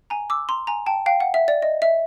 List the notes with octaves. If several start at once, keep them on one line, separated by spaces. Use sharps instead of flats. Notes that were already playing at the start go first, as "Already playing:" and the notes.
G#5 A#5
D6 E6
A#5 C6
G#5 A#5
G5 A5
F5 G5
F#5
E5
D5
D#5
E5